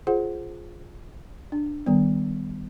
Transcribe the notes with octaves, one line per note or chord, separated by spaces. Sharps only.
F4 G#4 C5 F#5
D4
D#3 G3 B3